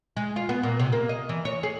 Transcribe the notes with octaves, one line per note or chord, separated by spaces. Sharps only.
G#3
F4
B3
A#2
C3
A#3
D#5
E3
C#5
G#4